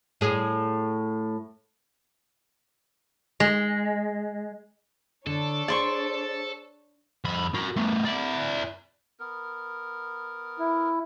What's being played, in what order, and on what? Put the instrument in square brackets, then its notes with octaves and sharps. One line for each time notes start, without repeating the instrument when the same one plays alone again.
[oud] A2 G#4
[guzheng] G#3
[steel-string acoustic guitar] D3 [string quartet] D4 C#5 [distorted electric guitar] A4
[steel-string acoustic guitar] G#4 C5 [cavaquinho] D5 C6 C#6
[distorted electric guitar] F2 B5
F#4 A#4
A3 B3
E4 D5
[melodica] B3 A#4
[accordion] E4